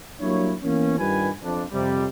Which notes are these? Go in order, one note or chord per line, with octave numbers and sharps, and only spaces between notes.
F#3 G3 A#3 D4 E4 C#5
E3 A#3 B3 C#4
G2 D#3 G3 F4 B4 G#5
F2 D4
F2 C3 G3